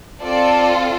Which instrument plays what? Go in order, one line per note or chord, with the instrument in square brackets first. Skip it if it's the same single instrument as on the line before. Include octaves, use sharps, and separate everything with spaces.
[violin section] C4 F4 A4 D5